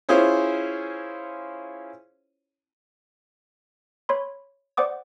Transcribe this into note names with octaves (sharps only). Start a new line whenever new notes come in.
C#4 E4 F4 G#4 C5 C#5
C#5 B5 C6
C5 D5 F#5 D6 D#6